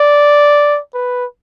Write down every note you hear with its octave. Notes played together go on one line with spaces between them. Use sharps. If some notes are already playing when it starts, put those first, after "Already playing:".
Already playing: D5
B4